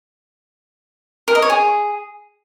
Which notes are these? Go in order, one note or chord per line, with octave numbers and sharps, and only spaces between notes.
A#4
D#5
C#5
G#4